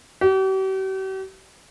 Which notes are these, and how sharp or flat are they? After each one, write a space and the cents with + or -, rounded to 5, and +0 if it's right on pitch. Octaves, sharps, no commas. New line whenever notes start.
G4 -45